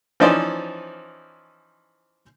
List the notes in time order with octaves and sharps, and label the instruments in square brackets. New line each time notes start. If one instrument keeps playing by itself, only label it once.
[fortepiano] E3 F3 C#4 D#4 C5 D5